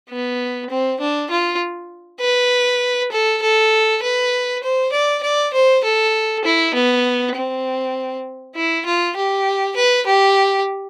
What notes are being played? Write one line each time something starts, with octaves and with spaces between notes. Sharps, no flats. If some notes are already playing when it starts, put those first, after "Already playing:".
B3
C4
D4
F4
B4
A4
A4
B4
C5
D5
D5
C5
A4
E4
B3
C4
E4
F4
G4
B4
G4